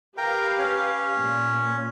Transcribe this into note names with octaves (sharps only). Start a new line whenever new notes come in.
G4 A#4 B4 F5 G5
C#4
A#2